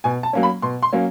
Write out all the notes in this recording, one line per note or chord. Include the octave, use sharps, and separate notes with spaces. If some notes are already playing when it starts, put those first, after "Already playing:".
B2 G#5
A5
F#3 A#3 C#4
B5
B2 C6
C6
F#3 A#3 C#4